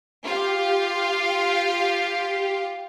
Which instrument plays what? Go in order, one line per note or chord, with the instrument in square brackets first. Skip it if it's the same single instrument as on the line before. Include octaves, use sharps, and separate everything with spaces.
[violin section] F4 F5 [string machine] G4